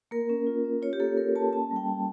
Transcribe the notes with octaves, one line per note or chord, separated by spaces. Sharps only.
A#3 A#4
C#4
F4
C#4
F4 C#5
G4
A#3 A4
A#3 A#4
A#3 A5
C#4 A5
G3
G5
G3